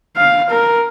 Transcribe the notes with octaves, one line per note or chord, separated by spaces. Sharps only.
F5
A#4